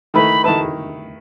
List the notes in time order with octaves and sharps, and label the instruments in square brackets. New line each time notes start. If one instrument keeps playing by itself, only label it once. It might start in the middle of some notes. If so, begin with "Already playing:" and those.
[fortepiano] D#3 A3 E4 B4 [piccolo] B5
[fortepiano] D#3 A3 E4 B4 [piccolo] A5